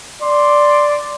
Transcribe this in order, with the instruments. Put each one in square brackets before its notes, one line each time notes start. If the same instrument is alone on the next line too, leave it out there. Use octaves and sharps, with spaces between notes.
[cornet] D5 [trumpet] C6